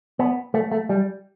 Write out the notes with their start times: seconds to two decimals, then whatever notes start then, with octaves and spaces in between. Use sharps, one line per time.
0.19 B3
0.54 A3
0.71 A3
0.89 G3